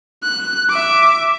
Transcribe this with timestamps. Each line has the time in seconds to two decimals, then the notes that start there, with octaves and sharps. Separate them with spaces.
0.23 F#6
0.69 E5 D6